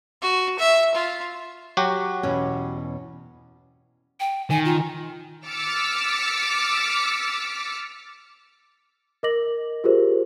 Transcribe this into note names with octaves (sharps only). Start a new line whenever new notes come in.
F#4
E5
F4
F#3 F#4 G4
E2 B2 C#4
G5
D#3 G#5
F4
D6 E6 F6 A6 B6 C#7
A#4 D#5 D6 A#6 F#7
F4 G4 G#4 A#4 C5